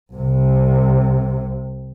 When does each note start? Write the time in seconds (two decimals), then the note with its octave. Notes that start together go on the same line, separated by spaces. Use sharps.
0.13 C2 C3